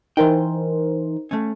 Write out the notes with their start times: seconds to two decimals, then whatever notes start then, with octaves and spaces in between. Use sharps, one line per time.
0.17 E3 D#4 A#4 C5 G5
1.31 A3 C#4